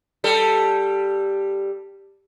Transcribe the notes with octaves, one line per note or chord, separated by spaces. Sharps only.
G3 A4